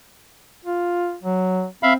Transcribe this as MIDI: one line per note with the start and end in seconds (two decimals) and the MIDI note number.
0.65 1.15 65
1.23 1.66 54
1.83 1.97 60
1.83 1.93 76
1.83 1.93 77
1.83 1.93 83